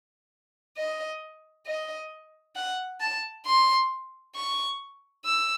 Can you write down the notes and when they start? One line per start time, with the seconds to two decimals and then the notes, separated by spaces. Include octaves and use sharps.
0.77 D#5
1.66 D#5
2.55 F#5
3.00 A5
3.45 C6
4.36 C#6
5.25 E6